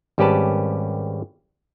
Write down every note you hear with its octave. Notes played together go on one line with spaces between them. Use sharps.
G#1 G3 C#4 G4 B4 A5